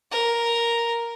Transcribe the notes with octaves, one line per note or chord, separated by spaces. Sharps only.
A#4